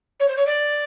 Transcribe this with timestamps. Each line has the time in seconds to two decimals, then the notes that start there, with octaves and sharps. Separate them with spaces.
0.20 C#5
0.28 C5
0.36 C#5
0.46 D5